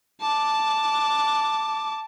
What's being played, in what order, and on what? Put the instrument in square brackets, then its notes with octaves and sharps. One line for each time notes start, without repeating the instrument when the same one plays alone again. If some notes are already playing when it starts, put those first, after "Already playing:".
[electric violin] A5 D6